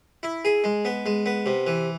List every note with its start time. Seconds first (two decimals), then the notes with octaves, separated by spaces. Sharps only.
0.23 E4
0.45 G#4
0.64 G#3
0.85 B3
1.06 G#3
1.26 B3
1.46 C3
1.67 E3